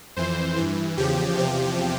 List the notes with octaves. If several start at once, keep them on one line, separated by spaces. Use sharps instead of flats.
F2 E3 C5
G2 E3
E2 C#3 F3 G4
E2 C3 F3 G4